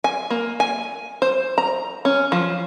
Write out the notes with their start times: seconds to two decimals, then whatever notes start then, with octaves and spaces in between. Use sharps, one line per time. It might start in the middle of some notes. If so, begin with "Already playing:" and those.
0.04 G#5
0.30 A#3
0.60 G#5
1.22 C5
1.58 A#5
2.05 C#4
2.32 F3